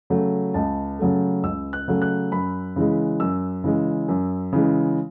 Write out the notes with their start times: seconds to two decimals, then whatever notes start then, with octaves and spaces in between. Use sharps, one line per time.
0.10 C#3 F#3 A3
0.54 C#2 A5
0.99 C#3 F#3 A3
1.43 C#2 E6
1.73 F#6
1.88 C#3 F#3 A3
2.02 F#6
2.31 F#2 B5
2.76 C#3 E3 G#3
3.20 F#2 E6
3.64 C#3 E3 G#3
4.09 F#2
4.53 C#3 E3 G#3